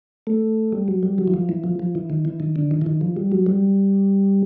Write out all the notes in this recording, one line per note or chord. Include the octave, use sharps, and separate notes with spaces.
A3
G3
F#3
G3
F#3
E3
F3
E3
F3
F3
E3
D#3
E3
D#3
D3
D#3
E3
D#3
F3
G3
F#3
G3